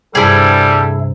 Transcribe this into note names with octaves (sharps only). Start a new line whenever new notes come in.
G2 C3 G3 E4 G#4 A4